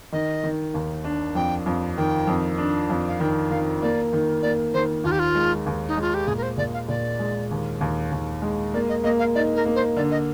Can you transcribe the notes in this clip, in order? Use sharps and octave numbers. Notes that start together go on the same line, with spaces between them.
D#3 D#5
D#3
D#2
D4
F2 G5
F2
D#3 G5
F2
D4
F2
F5
D#3 G5
D#3 F5
A#3 D5
D#3
A#3 D5
D#3 C5
D#2 F4
G4
F4
G#3
D#2
D#4
G#3 F4
G4
A#2 G#4
A#4
C5
A#2 D5
F5
A#2 D5
G#3
D#2
D#2
D#2
G#3
A#3 D5
D#5
A#3 D#5
F5
D#4 D5
A#4
A#3
C5
D3 D5
D#5